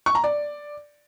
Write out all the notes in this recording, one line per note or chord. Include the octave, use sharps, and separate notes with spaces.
C#6
A#5
D5